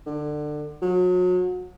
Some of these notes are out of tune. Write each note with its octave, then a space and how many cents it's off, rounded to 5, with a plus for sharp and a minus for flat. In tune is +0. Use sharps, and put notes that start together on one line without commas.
D3 +25
F#3 -35